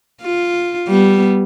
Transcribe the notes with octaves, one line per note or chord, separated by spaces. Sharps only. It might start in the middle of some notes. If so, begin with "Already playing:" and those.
F4
G3 B3